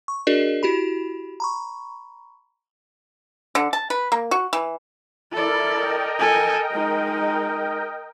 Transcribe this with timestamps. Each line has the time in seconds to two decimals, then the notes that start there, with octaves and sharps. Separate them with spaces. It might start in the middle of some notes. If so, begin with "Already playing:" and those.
0.08 C#6
0.27 D4 F#4 G#4 A#4 D5 D#5
0.63 E4 F#4 G4 B5
1.40 A#5 B5 C#6
3.55 D3
3.73 A5
3.90 B4
4.12 A#3
4.31 F#4
4.53 E3
5.33 E4 A4 A#4 D5
5.74 A#4 D#5 G5
6.19 A4 G#5
6.72 G#3 D#4